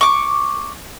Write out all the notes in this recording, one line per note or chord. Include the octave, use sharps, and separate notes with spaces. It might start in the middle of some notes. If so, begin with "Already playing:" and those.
C#6 D6